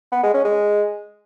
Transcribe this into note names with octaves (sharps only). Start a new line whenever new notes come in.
B3
G#3
C#4
G#3